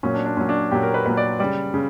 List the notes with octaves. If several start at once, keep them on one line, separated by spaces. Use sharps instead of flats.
A#2 F#3 C#4
D4
D4
A#2 F#3 C#4
D4
A#2 F#3 G4
A#4
B4
A#2 F#3 B4
D5
C#3 G3 D5
C#3